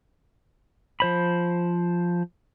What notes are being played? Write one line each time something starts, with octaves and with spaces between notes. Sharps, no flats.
F3 C5 B5